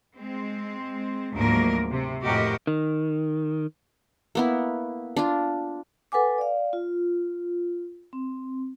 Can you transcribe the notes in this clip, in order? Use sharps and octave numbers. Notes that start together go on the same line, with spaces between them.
G#3 C4
D2 G#2 F3 F#3 A#3 A#4
C3
F2 A2 F#4 G4 A#4 D#5
D#3
A#3 B3 E4
D4 F4
A4 B4 F#5 G#5 D6
D5 F5
F4
C4